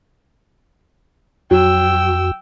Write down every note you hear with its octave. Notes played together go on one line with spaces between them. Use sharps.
F2 F#3 F#4 G5 E6